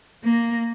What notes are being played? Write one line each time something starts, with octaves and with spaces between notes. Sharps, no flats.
A#3